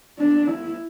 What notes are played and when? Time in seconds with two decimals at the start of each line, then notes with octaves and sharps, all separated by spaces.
0.19 D4
0.47 E4